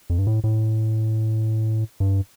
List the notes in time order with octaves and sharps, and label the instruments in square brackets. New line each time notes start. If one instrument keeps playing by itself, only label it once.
[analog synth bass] F2
G2
A2
A2
G2